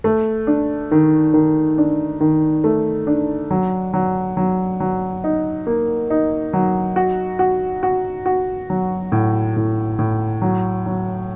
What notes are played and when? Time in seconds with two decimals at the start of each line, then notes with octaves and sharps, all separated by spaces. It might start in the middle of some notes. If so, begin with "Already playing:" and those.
0.04 A3
0.47 D4
0.91 D#3
1.34 D#3
1.78 D4
2.21 D#3
2.64 A3
3.07 D4
3.51 F#3
3.94 F#3
4.37 F#3
4.80 F#3
5.24 D#4
5.67 A#3
6.10 D#4
6.53 F#3
6.96 F#4
7.39 F#4
7.83 F#4
8.26 F#4
8.70 F#3
9.12 A2
9.56 A2
9.99 A2
10.42 F#3
10.86 F#3